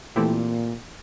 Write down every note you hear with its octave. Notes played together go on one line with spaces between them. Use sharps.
A#2 E3 A3 C4 E4 G4